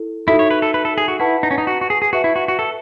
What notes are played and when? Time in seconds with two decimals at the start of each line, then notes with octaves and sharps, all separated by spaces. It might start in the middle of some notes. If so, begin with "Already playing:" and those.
Already playing: E4 A4
0.27 D#4 E4 F#4 A4 E5
0.39 C#5
0.51 B4
0.62 A4
0.74 B4
0.85 A4
0.98 G#4
1.08 F#4
1.20 E4 B4 F#5 A5 C#6
1.43 D#4
1.51 C#4
1.58 D#4
1.67 F#4
1.81 F#4
1.90 G#4
2.02 G#4
2.13 F#4 B4 E5 A5
2.24 E4
2.36 F#4
2.48 F#4
2.59 A4